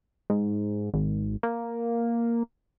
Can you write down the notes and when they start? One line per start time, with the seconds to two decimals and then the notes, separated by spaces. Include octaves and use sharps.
0.30 G#2
0.94 G#1
1.43 A#3